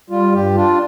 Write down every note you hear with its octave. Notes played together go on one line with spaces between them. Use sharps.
G3 F4
G2 G4
D4 F4